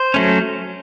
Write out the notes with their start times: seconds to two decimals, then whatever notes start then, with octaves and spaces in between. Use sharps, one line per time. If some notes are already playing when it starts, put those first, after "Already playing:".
Already playing: C5
0.14 F#3 A3 C#4